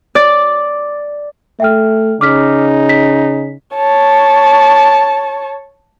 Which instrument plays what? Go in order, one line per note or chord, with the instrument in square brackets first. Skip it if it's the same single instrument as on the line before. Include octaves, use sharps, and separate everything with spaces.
[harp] D5
[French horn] A3 [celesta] E5 G5 F6
[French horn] C#3 [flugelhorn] D#4 [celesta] D6 F6 B6
[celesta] B6
[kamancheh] C#5 A5